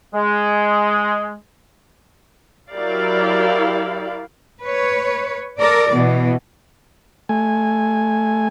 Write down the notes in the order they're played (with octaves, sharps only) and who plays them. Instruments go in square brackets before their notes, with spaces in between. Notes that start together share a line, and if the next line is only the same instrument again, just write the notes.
[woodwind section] G#3
[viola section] F#3 E4 G4 A#4 D5 F5
[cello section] B4 C#5
A4 A#4 D5
B2 E3
[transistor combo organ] A3 G#5